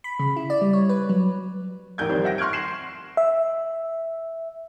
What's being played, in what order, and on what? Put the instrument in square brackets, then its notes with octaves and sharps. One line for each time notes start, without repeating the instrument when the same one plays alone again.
[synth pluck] B5
C#3
E4
D5
G3
C#5
B4
F#3
[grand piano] A1 A#4 G6 G#6
F2 D#3 G3
E5 F#5 A#6 D7
C6 C#6 F6 F#6 G#6 D7
C7 E7 F#7
[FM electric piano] E5